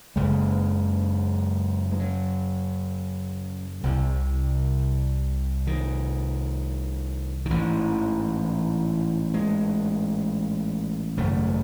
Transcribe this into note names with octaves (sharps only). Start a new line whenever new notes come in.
F#1 F#2 C#3 G#3
G#3
F#3
C2 C3
D#3
D#3
A1 G#2 E3
G#3
G#1 F#2 C#3 A3